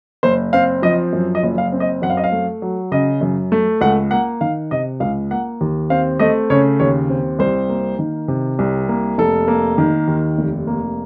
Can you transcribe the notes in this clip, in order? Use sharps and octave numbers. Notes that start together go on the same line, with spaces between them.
F#1 C5
C4 F5
F3 D#5
F#2
D#5
F#1
F5
C4
D#5
F#2 F#5
F5
D#5
F5
A3
F#3
C#3 D#5
F#2
A3
C#2 F#5
A#3 F#5
D#3 F5
C3 D#5
C#2 F5
A#3 F#5
D#2
C4 F5
A3 D#5
C#3 C#5
D#2 C#5
C4
C2 C5
A#3
D#3
C3
C2
A#3
F1 A4
A#3
D#3
D#2
F1
A#3